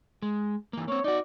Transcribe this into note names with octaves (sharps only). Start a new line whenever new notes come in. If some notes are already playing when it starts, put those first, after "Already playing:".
G#3
E3 A#3
A#3 C4 C#5
D#4 F#4 D5